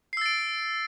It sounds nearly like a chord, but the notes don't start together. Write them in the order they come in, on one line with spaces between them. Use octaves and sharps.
C7 E6 A6 D7